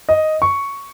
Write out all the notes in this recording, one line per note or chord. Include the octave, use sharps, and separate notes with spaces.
D#5
C#6